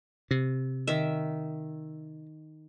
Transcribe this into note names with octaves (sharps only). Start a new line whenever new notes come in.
C3
D#3 E5